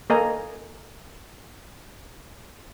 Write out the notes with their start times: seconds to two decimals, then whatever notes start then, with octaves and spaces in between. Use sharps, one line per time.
0.10 A#3 A4 D#5 G#5 A#5